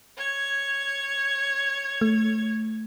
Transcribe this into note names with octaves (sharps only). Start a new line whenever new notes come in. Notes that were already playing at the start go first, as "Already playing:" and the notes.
C#5 G#6
A3